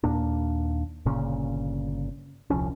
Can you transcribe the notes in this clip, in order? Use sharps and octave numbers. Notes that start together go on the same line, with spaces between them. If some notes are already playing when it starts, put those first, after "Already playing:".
D#2 A#2 A#3 D4
G1 A#2 C#3 C#4
D#1 C2 F3 C#4